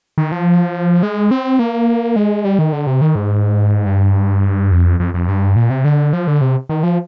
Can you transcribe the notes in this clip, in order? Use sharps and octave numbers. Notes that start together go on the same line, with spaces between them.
D#3
F3
G#3
C4
A#3
G#3
G3
D#3
D3
C3
D#3
G#2
G2
F2
F2
F2
G2
A#2
C3
D3
F3
D3
C3
D#3
F3